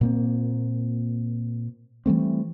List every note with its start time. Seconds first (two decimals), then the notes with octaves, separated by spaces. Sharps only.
0.01 A#2 A#3 C4
2.06 E3 G3 A3 C4